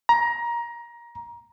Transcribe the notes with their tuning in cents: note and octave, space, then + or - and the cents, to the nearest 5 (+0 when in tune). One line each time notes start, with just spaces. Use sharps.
A#5 +20